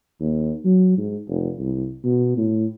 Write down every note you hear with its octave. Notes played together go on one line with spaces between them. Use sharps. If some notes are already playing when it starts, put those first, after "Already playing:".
D#2
F#3
G#2
F1
C2
B2
A2